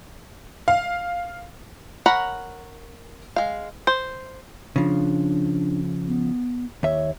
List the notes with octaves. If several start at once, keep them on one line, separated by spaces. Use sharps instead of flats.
F5
A#4 C#5 F#5 A#5 B5
G#3 F5
C5
C#3 F3 D4
B3
D#2 C#5 E5